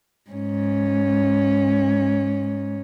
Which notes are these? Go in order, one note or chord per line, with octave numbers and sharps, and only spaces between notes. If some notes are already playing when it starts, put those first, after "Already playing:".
G#2 C#4